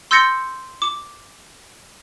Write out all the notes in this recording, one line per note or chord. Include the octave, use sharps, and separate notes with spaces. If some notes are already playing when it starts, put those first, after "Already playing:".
C6 E6 G6 A6 A#6 C#7
D6